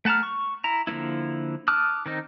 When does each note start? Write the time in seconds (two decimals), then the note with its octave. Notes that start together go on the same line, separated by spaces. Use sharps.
0.05 A3 F#5 A5 A#5 F6
0.23 C#6
0.64 E4 A#5
0.87 D3 F3 A#3 B3 E4
1.68 A5 D6 D#6 F6 F#6
2.06 D#3 C4 D#4